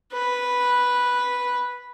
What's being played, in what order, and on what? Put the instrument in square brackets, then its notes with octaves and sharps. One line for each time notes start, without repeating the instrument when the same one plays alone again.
[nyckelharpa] B4